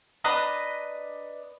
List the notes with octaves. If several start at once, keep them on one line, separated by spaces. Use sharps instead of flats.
D4 B4 D#5 A#5